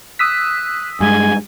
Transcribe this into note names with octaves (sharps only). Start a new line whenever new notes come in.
D#6 E6 F#6 B6
G2 G#3 G#5